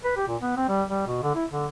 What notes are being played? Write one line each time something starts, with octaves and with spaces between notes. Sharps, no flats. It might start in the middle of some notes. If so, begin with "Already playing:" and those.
B4
G4
A#2
B3
C4
G3
G3
B2
D3
E4
D3